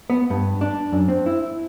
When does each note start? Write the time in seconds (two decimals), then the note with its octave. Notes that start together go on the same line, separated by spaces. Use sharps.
0.10 B3
0.30 G2
0.61 D4
0.92 F#2
1.08 C4
1.26 E4